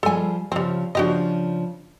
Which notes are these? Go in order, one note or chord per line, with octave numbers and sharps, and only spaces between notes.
F3 G3 G#4 A4 G#5
C#3 F3 G3 C4
C#3 F3 D4 F#4 G4 D#5